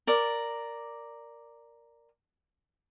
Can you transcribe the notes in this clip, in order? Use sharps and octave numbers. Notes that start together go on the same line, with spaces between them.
A#4 D5